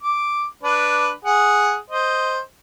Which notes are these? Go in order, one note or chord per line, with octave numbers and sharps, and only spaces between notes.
D6
D4 B4
G#4 F#5
C5 D#5